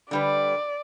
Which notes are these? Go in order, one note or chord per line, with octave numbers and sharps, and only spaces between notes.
D3 G3 B4 D5